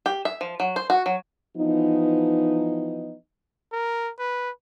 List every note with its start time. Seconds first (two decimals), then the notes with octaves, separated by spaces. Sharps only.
0.06 G4
0.25 E5
0.41 F3
0.60 F#3
0.76 C5
0.90 F#4
1.06 F#3
1.57 E3 F3 B3 D#4
3.72 A#4
4.19 B4